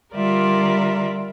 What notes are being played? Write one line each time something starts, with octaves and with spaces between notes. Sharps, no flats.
D3 G3 F4 A#4 D5 E5